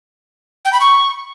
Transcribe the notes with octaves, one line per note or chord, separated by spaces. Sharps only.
G5
B5
C#6